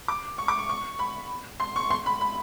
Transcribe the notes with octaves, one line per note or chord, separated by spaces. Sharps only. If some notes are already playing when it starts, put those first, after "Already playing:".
D6
C#6
D6
C#6
C#6
B5
C6
C#6
C6
B5
B5